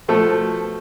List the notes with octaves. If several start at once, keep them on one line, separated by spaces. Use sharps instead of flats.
B2 F3 A3 A4